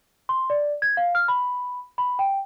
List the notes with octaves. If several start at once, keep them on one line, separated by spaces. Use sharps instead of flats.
C6
D5
G#6
F5
F6
B5
B5
G5